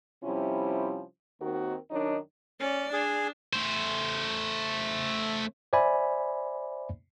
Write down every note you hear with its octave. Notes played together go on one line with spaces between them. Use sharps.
C3 F3 G3 C#4 E4
D#2 D#3 C4 F#4 A#4
F#2 D#3 D4 D#4 C#5
C#4 D5
D4 G#4
A3 C5
C5 D5 E5 G#5 B5